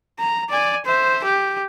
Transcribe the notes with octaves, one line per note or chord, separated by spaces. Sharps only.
A#5
D5 G#5
C5 E5
G4